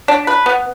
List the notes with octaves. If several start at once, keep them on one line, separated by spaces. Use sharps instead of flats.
D4
B4
B3